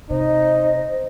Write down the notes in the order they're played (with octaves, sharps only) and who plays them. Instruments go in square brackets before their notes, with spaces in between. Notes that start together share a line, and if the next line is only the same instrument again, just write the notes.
[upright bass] C3 [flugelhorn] D#4 [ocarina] C5 [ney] D#5